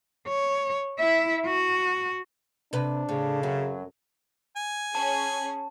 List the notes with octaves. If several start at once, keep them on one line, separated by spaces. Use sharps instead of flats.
C#5
E4 E5
F#4
C3 D4 B4
A2 C#3
F#2 F#3
G#5
C#4 G#4 A5